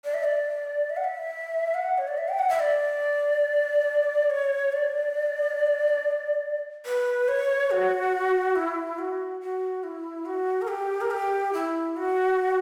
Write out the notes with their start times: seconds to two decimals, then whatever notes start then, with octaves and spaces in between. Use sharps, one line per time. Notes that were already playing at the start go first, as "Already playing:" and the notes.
0.05 D5
0.14 E5
0.24 D5
0.90 E5
0.97 F#5
1.04 E5
1.74 F#5
1.98 C#5
2.08 D5
2.17 E5
2.28 G5
2.39 F#5
2.49 E5
2.60 D5
4.30 C#5
4.72 D5
6.86 B4
7.28 C#5
7.71 F#4
8.56 E4
8.99 F#4
9.41 F#4
9.83 E4
10.26 F#4
10.62 A#4
10.68 G4
11.01 A#4
11.11 G4
11.53 E4
11.96 F#4